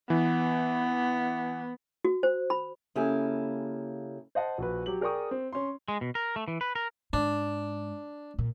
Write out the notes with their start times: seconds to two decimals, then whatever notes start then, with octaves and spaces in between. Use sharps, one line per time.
0.10 E3 B3
2.05 F#4
2.23 C5
2.50 B5
2.95 C#3 A#3 E4 G4 A4 G#5
4.35 C5 D#5 F#5 A5
4.58 A#1 F#4 B4
4.86 F#3 G4 F#7
5.01 G#4 A#4 D5 G5 C#6 D#6
5.31 C4
5.53 C#4 C6
5.88 G#3
6.01 B2
6.15 A#4
6.36 A3
6.48 E3
6.61 B4
6.75 A#4
7.13 G#2 D4
8.39 A#2